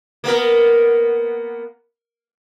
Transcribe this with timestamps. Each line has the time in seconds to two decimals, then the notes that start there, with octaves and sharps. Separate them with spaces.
0.24 A#3 B3 A#4